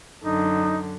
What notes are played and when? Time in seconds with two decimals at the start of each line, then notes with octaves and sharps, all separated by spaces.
0.24 F#2 D3 D#4